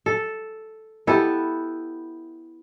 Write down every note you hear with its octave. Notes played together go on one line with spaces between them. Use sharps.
A4
B3 E4 G4 A4